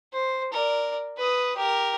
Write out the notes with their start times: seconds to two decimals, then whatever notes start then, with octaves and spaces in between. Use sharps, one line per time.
0.13 C5
0.53 A#4 D5
1.18 B4 D#6
1.57 G4 A#4